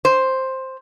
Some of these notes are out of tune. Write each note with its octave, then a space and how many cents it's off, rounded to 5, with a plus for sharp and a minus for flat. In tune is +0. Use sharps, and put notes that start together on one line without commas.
C5 +5